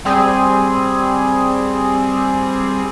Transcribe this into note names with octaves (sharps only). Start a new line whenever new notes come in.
G3 C4 G#4